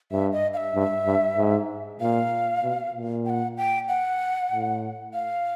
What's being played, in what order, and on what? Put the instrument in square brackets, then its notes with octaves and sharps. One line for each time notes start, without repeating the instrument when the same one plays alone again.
[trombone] G2 [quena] E5
[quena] D#5
F5
E5
[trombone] G2
G2
G#2
[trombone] A#2 [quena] F5
[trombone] B2
A#2
[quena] G5
F#5
G5
F#5
[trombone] A2
[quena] F5